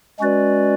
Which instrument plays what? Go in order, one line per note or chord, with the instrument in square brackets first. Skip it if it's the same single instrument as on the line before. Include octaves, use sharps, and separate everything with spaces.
[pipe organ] G#3 C#4 F#4 B4 D5